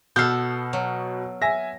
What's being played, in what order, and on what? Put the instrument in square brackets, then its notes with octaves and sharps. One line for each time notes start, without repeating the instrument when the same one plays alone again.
[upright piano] B2 C7 [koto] B3 A4 [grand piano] E6 F6 G6
[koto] F#3
[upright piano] E5 G#5 [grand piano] A#6